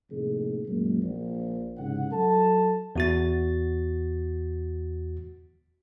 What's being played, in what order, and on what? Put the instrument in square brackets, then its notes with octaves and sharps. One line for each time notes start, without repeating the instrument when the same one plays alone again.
[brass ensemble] F2 A2 C3 D#3 A#3 G#4
F#2 A#2 F#3 G#3 A#3
A#1
C2 G#2 C#3 F#5
F#3 A4 A5
[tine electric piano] E2 F#4 A6